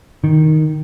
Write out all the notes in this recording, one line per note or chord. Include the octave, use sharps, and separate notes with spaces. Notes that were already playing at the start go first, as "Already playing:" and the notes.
D#3